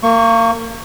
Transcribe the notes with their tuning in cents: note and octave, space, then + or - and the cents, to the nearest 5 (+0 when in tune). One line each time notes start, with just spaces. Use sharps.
A#3 -30 C#6 +0